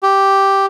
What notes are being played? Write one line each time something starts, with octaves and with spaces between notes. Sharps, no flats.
G4